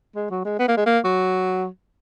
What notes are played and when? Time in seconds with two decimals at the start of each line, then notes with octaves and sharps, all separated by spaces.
0.16 G#3
0.30 F#3
0.45 G#3
0.59 B3
0.68 A#3
0.77 G#3
0.86 A#3
1.05 F#3